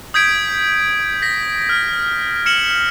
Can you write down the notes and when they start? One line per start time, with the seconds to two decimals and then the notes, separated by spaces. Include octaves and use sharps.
0.14 D#6 G6 G#6 B6 D7
1.22 A#6 B6
1.69 F6
2.46 F6 C#7 E7 F#7